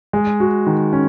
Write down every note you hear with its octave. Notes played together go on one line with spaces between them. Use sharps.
G#3
F#4
D#3
C#4